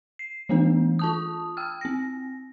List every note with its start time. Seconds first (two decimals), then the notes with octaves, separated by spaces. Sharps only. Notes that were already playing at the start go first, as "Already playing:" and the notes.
0.19 C7
0.49 E3 A3 B3 D4 B4
0.99 F4 A5 D#6
1.57 G5 E6 F6
1.81 C4 A#6